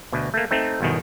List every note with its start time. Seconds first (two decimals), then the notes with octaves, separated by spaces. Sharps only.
0.13 D2 B2
0.34 A3 A#3
0.51 A3 C4 D#4
0.81 G1 E2 B2 D#3